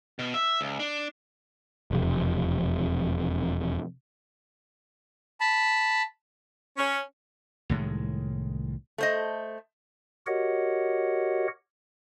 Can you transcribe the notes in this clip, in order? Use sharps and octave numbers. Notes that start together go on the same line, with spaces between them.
B2
E5
C#2
D4
E1 F2 C3
A5 B5
C#4
C2 A2 D#3 G#3
A3 C5 D#5
F#4 G4 A#4 C#5 D#5 F#5